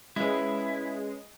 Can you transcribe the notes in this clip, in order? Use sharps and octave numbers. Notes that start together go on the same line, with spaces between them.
G#3 C#4 E4 B4